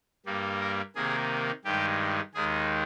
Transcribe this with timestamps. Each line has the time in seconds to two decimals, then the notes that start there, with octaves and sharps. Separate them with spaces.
0.26 G2 G3 A#3
0.61 A#4
0.95 C3 D#3 A#3 G#4
1.64 G2 D#3 G#3 G4
2.34 D#2 D#3 G#3 G#4